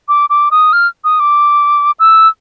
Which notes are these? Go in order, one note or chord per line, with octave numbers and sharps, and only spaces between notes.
D6
D6
D#6
F6
D#6
D6
E6